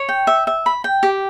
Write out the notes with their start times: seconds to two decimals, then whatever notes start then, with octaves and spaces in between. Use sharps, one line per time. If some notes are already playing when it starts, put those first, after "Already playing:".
Already playing: C#5
0.09 G5
0.27 E5
0.47 E5
0.66 B5
0.84 G5
1.03 G4